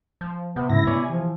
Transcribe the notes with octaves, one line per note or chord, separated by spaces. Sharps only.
F3
C3 B3
G#2 C#3 E4 A#6
B3 C#5 D5 G#5
E3 F3